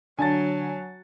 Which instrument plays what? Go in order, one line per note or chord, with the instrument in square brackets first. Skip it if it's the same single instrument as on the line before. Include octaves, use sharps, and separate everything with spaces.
[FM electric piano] D3 D4 [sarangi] F#3 [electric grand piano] G#5 A5 A6